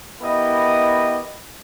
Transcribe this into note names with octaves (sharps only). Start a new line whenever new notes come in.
B3 E4 G4 A#4 D#5